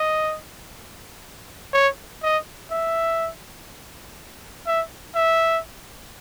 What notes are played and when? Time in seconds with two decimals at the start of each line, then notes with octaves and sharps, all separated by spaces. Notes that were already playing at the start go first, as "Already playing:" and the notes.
Already playing: D#5
1.73 C#5
2.23 D#5
2.71 E5
4.67 E5
5.15 E5